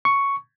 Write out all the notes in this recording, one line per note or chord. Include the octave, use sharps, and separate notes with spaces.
C#6